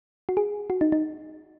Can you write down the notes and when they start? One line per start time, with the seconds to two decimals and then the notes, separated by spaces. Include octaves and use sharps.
0.29 F#4
0.37 G#4
0.70 F#4
0.81 D#4
0.92 D#4